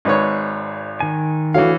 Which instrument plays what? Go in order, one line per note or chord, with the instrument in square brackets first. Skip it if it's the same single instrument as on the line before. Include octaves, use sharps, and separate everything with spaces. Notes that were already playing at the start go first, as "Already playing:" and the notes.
[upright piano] G#1 D5 [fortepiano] G#2 B4 C#5
[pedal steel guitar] D#3 G#5
[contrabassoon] D2 [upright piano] E3 C#5 [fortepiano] F5